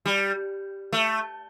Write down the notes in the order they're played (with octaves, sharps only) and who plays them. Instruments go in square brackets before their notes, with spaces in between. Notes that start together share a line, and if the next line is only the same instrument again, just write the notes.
[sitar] G3
A3